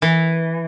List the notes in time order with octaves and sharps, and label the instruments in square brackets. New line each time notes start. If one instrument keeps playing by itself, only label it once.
[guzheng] E3